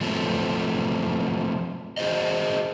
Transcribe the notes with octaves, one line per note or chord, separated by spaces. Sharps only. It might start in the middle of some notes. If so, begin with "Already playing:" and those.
F3 F#3 A3 B3 C4
F#4 G#4 C5 D#5